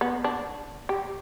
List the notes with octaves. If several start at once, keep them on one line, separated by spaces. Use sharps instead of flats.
B3
D4
G4